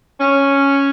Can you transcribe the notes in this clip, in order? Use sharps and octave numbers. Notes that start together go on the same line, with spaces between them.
C#4